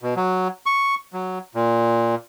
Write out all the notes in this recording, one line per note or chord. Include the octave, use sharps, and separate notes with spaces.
B2
F#3
C#6
F#3
A#2